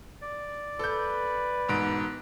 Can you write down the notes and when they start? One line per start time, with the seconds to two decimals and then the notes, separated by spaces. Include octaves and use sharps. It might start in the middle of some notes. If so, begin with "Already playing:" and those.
0.21 D5
0.79 A4 B4 G6
1.69 E1 G#2 D7